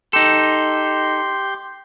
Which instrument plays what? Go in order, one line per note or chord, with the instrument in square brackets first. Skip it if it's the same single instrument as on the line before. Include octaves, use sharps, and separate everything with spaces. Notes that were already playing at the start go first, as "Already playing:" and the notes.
[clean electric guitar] D#4 A4 [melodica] G4 C6